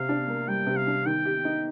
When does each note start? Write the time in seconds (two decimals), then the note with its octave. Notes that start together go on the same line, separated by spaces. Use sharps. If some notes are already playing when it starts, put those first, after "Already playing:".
Already playing: C3 F5
0.09 D4
0.28 A#3
0.48 G3 G5
0.67 C3
0.77 F5
0.87 D4
1.06 D#3 G5
1.26 G4
1.45 D#4